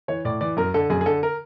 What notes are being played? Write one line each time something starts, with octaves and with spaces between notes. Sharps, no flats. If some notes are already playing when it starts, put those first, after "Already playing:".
E3 C#5
A2 D5
E3 D5
F#2 A#4
D3 A4
F#2 G#4
G#4
D3 A4
A#4